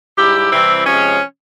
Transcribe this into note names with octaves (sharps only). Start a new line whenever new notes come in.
G#2 G3 E4 G4
C3 E3 G3 C4 E4
C3 F3 G#3 C#4